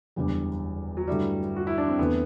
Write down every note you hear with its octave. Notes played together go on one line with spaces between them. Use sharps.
F#1 E2 D3 G3
F#3
G2 D3 G3 A3 E4
F#4
E4
D4
C4
E2 D3 A3 B3 C4